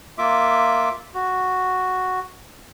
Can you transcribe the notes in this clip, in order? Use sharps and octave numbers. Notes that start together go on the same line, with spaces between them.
A#3 F4 E5 D6
F#4